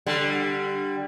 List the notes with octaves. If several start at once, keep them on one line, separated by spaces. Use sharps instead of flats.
D3 G3